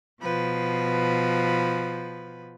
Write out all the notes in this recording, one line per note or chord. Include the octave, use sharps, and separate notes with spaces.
B2 F3 B4